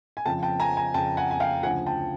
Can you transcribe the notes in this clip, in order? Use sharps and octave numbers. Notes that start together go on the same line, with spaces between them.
G#5
F2 C#3 F3 G5 A5
G5 A5
G#5 A#5
G#5 A#5
F2 C#3 F3 G5 A5
F#5 G#5
G#5
F5 G5
D2 C#3 F3 F#5 G#5
G5 A5